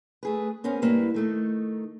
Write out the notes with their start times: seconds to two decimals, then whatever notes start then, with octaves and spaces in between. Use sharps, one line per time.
0.23 A3 G#4 B4
0.64 B3 C#4 A#4 C5 G#5
0.82 G2 A#3 E4 G4 B4 F5
1.14 D#3 A3 D#4